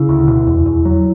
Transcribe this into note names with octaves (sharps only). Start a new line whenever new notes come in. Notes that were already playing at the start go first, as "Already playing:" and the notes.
Already playing: C#3 E4
D2
B2
E2
E2
F#3